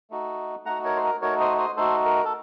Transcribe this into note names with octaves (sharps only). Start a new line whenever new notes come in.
A3 D#4 F#4
A3 D#4 F#4 F#5 A#5
A#4 C#5
C5
A#4
A3 D#4 F#4 A#4 C#5
C5 D#5
C5 D#5
A3 D#4 F#4 A4 C5
A#4
A4